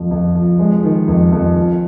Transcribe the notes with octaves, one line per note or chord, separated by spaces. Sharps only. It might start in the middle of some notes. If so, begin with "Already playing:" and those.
Already playing: F2 F3 F4
F2
F3
G#3
D#3
F2
F2
F3